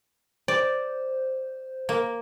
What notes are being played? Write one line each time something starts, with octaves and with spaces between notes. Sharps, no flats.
C5 D5
A#3